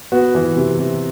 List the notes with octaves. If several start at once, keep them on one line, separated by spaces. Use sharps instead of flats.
B3 F#4
E3
C3
C3